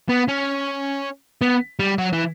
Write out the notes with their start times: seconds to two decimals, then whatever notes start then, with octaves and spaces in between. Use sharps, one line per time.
0.09 B3
0.28 C#4
1.41 B3
1.79 G3
1.99 F#3
2.13 E3